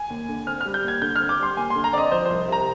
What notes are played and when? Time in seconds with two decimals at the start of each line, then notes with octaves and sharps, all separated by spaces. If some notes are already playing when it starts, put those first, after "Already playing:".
Already playing: G#5
0.10 D#2
0.29 D3
0.47 C4 F6
0.61 G3 F6
0.74 G6
0.84 D#2 G#6
1.02 D3 G6
1.16 C4 F6
1.29 D6
1.39 G3 C6
1.57 D#2 G#5
1.70 C6
1.76 D3
1.84 A#5
1.93 C4 D5 D#5
2.12 F3 C5
2.26 C2 C5
2.48 C3 A#5